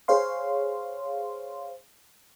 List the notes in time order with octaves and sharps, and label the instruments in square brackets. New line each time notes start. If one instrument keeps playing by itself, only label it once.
[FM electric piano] G#4 C5 C#5 F5 C6